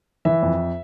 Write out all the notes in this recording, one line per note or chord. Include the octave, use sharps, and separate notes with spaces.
E3 E5
F2